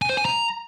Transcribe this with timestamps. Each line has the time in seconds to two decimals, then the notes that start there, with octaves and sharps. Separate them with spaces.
0.02 G#5
0.10 C5
0.17 G#5
0.25 A#5